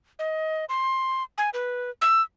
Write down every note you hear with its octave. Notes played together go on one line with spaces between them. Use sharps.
D#5
C6
G#5
B4
E6